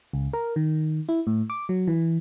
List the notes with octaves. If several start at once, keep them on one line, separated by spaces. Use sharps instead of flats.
C#2
A#4
D#3
E4
A2
D6
F#3
E3